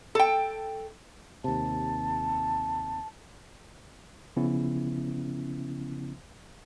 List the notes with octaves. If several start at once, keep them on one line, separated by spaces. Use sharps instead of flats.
A4 G5
D#2 C3 A5
C#3 F3 B3 C#4 E4